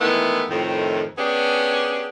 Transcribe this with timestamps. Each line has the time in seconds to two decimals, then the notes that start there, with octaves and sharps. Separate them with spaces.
0.01 D#3 E3 G#3 A3 B3 E4
0.50 F2 A2 D#3
1.18 B3 C#4 D4 G4 G#4